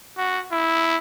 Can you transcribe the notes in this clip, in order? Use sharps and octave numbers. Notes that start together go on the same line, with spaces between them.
F#4
E4